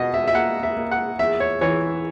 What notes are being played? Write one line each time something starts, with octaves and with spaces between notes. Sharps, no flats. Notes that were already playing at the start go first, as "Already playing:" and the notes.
Already playing: B2 D#5
E5
E5
A#3 F#5
E5
A#3
F#5
E2 E5
C#5
E3 C#5